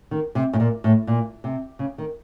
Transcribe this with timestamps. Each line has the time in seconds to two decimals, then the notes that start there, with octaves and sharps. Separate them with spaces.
0.11 D#3
0.35 C3
0.53 A2
0.60 A#2
0.84 A2
1.07 A#2
1.44 C3
1.79 C#3
1.98 D#3